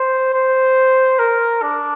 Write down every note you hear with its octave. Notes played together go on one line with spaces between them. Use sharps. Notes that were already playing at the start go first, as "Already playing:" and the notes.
Already playing: C5
C5
A#4
D4